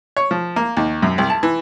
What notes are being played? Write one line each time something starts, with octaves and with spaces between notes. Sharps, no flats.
C#5
F3
A#3
D#2
F#2
C2
A5
E3